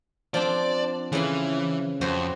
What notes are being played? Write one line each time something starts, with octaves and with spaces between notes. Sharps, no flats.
F3 C4 D4 D5
C#3 E3 B4 C6
F2 F#4 B4 C5